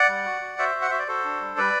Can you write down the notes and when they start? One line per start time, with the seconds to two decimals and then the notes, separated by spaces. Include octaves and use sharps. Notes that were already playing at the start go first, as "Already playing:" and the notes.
Already playing: D5 F#5
0.09 G3
0.26 F#4
0.41 F#4
0.58 F#4 C5 E5
0.75 F#4
0.82 F#5
0.90 F#4 E5
0.99 D5
1.08 F#4 A4 C5
1.24 D4
1.41 G3
1.57 G3 B4 D5